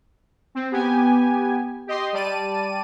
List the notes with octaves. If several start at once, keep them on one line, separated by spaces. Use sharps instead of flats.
C4
B3 G4 G#5
G4 D#5 C6
G3 D5 A5 D#7